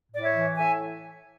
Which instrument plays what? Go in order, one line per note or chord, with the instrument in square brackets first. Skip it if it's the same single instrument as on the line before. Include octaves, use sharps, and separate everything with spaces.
[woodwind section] A2 D5
C#5 E5
E3
A2 E5 G#5